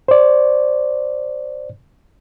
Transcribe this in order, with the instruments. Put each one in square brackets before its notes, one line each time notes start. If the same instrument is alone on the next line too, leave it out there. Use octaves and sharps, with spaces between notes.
[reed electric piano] C5 D5